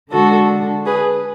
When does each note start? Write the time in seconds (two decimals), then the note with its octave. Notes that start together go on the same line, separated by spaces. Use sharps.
0.10 D3 G#3 D4 F#4 A4
0.85 G#4 B4